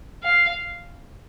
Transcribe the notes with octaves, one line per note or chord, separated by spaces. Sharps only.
F5